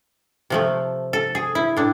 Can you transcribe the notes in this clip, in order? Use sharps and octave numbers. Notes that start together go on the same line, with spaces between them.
C3 F3 A3
A4
G#4
E4
A2 D4